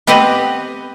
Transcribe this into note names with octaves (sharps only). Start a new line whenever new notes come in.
B3 C4 G4 B4 D#5